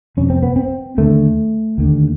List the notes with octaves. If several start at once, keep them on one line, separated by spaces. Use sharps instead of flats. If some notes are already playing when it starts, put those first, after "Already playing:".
F2 C3 C#4
C4
B3
C4
D#2 D3 A3
D#2 D3